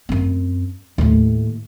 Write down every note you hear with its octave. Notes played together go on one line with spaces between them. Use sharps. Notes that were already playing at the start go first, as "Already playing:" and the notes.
F#2 C4
D#2 A2